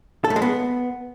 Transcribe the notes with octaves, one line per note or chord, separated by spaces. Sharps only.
A4
A3
G#3
B3